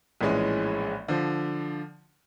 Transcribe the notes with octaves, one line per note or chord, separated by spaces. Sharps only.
A#1 A2 E3 G#3 C#4
D3 F3